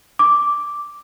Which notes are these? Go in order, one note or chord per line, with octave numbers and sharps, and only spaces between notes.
D6